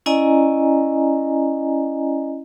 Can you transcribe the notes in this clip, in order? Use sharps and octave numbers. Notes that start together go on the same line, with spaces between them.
C#4 E4 D5 D#5 G#5 A#5